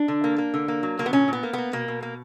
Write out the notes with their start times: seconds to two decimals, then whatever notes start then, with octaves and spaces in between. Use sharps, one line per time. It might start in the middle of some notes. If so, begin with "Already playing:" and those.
Already playing: D4
0.08 D3
0.24 A#3
0.38 A#3
0.54 D3
0.68 A#3
0.83 F#3
0.99 D3 A#3
1.06 B3
1.13 A#2 C#4
1.28 A#2 B3
1.43 A#3
1.53 A#3 B3
1.73 B2 A#3
1.88 B2
2.03 A#3